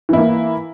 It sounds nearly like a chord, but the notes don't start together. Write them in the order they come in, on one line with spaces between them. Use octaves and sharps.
E3 E4 A#3